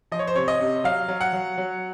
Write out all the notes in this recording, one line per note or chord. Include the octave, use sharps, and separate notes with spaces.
F3 D#5
C#5
C5
C3 C#5
D#5
C3
F#3 F5
F#3
F#5
F#3
F#3